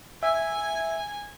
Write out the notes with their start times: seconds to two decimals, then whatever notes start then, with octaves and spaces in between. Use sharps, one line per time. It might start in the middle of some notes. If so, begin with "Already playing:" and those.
0.23 E5 G#5